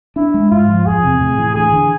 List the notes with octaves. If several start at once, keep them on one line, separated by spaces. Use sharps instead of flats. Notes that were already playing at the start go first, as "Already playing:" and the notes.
D4 E4
G#3
G#2 F4
F3
E2 G#4
C3
A2
E3
D2 G#4
D3